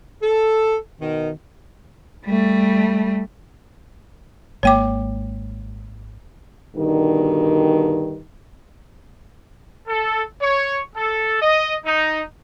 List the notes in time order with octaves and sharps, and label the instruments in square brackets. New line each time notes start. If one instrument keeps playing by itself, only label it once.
[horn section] A4
B2 D#3
[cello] G3 A3
[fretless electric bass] G#1 G#3 A#3 [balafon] C#5 G5 D6
[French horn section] G2 B2 D3 D#3
[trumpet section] A4
C#5
A4
D#5
D#4